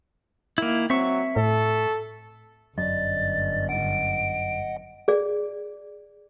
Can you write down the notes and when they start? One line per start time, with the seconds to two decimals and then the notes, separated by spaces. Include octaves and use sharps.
0.58 D#3 A#3 E4
0.90 F#3 C4 E5 C#6
1.36 A2 A4
2.78 G1 F#2 D5 D#5 A6
3.69 D#5 F#5 D7
5.08 G#4 D5